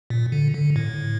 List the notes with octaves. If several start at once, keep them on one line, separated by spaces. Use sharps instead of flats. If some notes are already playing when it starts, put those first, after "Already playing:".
A#2
D3
D3
A2